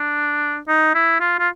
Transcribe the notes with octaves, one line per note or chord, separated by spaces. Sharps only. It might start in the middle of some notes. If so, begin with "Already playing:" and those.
Already playing: D4
D#4
E4
F4
F4